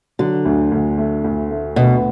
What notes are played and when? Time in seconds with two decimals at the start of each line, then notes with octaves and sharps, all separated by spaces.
0.19 D3 F#3
0.45 D2
0.72 D2
0.98 A3
1.24 D2
1.50 A3
1.76 D2 B2